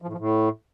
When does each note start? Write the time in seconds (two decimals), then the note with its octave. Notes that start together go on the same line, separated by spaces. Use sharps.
0.02 F3
0.07 A2
0.13 F3
0.19 A2